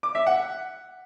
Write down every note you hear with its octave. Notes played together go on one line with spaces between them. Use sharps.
D6
E5
F#5